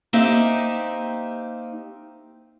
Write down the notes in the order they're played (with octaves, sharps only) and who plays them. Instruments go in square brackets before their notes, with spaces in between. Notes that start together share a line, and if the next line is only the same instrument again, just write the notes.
[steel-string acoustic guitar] A#3 C4 D#4 G4 E5